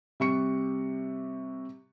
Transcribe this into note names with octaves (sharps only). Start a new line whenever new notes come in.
C3 G3 C#6 C#7